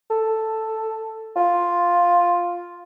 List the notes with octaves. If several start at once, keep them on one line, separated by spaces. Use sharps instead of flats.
A4
F4